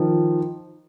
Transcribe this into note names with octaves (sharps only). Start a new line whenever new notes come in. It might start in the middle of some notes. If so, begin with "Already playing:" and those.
Already playing: D#3 F3